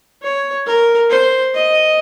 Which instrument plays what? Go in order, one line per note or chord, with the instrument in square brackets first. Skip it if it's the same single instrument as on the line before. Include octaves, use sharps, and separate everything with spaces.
[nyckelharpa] C#5
A#4
C5
D#5